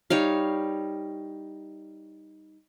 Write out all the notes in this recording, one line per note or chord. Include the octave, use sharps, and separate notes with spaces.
G3 D#4 C#5 F5